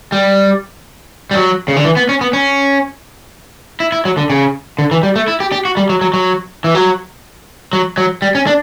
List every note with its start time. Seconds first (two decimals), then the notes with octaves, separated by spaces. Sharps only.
0.12 G3
1.31 G3
1.36 F#3
1.68 C#3
1.76 D3
1.85 E3
1.97 B3
2.09 C#4
2.21 B3
2.33 C#4
3.80 E4
3.92 E4
4.05 F#3
4.17 D3
4.30 C#3
4.79 D3
4.91 E3
5.03 G3
5.16 A3
5.28 E4
5.40 G4
5.52 G4
5.65 F#4
5.77 G3
5.90 F#3
6.01 F#3
6.14 F#3
6.64 E3
6.75 F#3
7.73 F#3
7.98 F#3
8.22 G3
8.35 C#4
8.47 D4